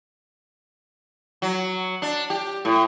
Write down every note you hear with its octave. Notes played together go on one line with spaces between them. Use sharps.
F#3
D4
G4
A2